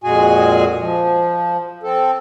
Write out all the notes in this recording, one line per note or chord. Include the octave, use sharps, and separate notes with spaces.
F2 A#2 G#3 F#4 G#4 G#5
F3
C4 A4